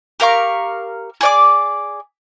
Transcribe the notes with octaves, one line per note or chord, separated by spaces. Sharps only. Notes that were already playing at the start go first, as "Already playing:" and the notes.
G4 A#4 F5 C#6
G#4 D5 D6